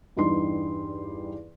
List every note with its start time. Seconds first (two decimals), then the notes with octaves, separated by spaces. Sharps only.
0.17 E2 G2 G3 D#4 G4 C6